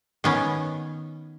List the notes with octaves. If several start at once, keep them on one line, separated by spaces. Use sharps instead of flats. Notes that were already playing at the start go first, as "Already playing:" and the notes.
D#3 B3 C#4